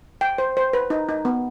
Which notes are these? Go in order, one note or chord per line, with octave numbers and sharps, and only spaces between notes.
G5
C5
C5
B4
D#4
D#4
B3